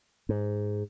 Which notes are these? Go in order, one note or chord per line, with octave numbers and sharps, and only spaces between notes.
G#2